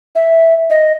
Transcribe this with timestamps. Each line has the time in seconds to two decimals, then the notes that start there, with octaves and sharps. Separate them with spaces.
0.15 E5
0.70 D#5